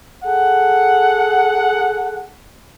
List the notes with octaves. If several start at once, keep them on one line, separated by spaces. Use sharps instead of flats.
G#4 A4 F#5